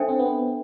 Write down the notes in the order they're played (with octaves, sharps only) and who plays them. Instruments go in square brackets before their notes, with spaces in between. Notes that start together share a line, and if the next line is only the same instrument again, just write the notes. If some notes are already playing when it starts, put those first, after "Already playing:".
Already playing: [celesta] D4 A4 C5 E5 G5
[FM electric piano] C4
B3